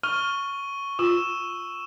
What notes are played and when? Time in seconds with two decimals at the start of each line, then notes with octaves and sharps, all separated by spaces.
0.03 C#6 F6 D#7 G7
0.99 F4 E6 E7